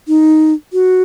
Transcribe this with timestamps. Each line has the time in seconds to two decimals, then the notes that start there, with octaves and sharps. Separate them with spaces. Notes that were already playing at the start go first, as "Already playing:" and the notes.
0.08 D#4
0.73 F#4